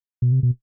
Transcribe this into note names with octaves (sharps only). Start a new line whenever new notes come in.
B2
C3
B2